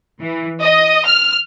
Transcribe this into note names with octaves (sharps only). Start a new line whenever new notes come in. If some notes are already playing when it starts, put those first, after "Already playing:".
E3
D#5
F6